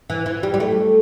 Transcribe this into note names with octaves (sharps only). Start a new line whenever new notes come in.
E3
E3
G3
G3
A3